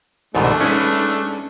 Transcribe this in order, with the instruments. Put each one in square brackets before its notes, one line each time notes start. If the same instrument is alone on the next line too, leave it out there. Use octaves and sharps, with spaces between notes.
[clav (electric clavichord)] C2 G#2 B2 [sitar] D3 D#3 [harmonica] A3 D4
[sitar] G2 G#4 B4 [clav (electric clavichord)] C#4